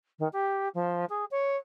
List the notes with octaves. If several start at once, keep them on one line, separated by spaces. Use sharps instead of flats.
D#3
G4
F3
G#4
C#5